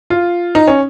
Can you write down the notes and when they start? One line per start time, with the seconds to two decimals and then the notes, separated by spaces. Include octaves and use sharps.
0.10 F4
0.55 D#4
0.67 C#4